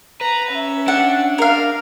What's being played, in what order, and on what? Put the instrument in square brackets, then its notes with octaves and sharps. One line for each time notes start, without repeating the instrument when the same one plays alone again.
[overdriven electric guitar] B4 [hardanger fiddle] A#5
[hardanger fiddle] C#4 E5
[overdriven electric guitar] D4 [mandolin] F#5
[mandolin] A#4 F5